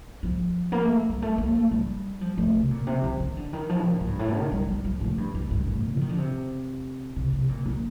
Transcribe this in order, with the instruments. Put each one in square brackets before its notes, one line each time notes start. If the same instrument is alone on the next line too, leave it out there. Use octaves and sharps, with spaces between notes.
[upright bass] F3
A#3
A3
G3
A3
A#3
A3
G3
F3
A3
C3
A#2
C3
D#3
D#3
D3
D#3
F3
A#2
A2
G2
A2
D#3
G3
G3
F3
A2
G2
F2
G2
A2
F3
D#3
D3
C3
C3
C3
A#2
A#2